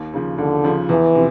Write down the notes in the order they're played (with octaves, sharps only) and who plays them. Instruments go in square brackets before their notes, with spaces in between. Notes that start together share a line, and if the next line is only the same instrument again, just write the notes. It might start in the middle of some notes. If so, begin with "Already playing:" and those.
Already playing: [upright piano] D#2
C#3 F3
[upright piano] D#2 [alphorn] D3
[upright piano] C#3 F3
[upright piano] E2 [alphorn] E3
[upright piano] C3 F3